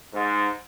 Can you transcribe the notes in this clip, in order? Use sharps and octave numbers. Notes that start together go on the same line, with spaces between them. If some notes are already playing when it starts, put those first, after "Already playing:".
G#2